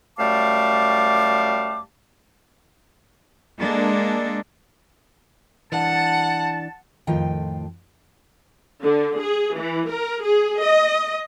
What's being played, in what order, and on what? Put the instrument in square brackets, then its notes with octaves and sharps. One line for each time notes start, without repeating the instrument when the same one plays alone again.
[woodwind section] F#2 G3 A3 F5 A5 D6
[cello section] G#3 A#3 D4 A4
[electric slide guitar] E3 D4 [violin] F#5 [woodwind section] A5
[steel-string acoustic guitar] F2 A2 D#3 F4 G5
[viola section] D3
G#4
E3
A#4
G#4
D#5